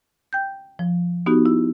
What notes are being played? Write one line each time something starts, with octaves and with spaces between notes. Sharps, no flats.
G5 G6
F3
B3 D#4 F#4 G4
E4